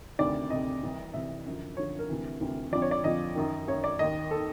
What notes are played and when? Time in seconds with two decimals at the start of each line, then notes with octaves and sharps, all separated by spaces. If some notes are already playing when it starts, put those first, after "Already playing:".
0.18 D2 C3 D#3 D5
0.50 D2 C3 D#3 D#5
0.83 C2 C3 E3
1.13 C2 C3 E3 E5
1.46 F#2 D3 F3
1.77 F#2 D3 F3 C#5
1.99 A#4
2.09 D2 C3 E3
2.40 D2 C3 E3
2.72 F2 D3 F3 D5
2.82 C#5
2.91 D5
3.04 F2 D3 F3 D#5
3.35 F#2 D#3
3.68 F#2 D#3 C#5
3.84 D5
3.99 D#2 D#3 D#5
4.31 D#3 A4